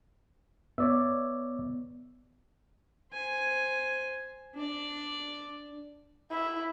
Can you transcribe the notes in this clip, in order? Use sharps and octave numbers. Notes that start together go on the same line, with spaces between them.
B3 C#5 D5 E5
C5 G#5
D4 D5
E4